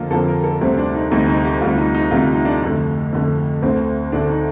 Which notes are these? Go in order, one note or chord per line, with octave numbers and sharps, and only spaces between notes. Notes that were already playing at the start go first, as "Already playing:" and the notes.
Already playing: F2 D3 F3 A#3 F4 A4
F2 D3 F3 A#3 A4
A#4
A4
D2 C3 G3 C4
D4
D#4
D2 C3 G3 D#4
D#4
G4
D2 C3 G3 F4
D#4
D#4
D2 C3 G3 F4
D#4
D4
F2 D3 A3
F2 D3 A3
D2 D3 A3 C4
D2 D3 A3 D4
D#4